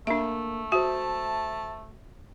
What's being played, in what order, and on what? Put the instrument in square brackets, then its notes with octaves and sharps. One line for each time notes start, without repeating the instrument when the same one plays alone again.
[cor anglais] A3 [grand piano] A#3 [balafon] D4 E5
[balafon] F#4 [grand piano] C5 E5 [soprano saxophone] A5